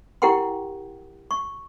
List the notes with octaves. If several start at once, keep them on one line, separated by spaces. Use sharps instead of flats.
E4 G4 A#4 F#5 G5 C6
C#6